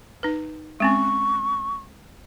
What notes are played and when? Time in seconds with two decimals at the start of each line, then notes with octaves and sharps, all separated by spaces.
0.23 D#4 B4
0.80 G#3 C4 C#4 C#6